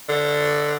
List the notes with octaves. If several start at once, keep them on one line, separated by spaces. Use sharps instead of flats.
D3